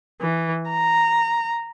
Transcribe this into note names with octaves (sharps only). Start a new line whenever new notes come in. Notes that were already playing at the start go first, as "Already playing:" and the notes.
E3
A#5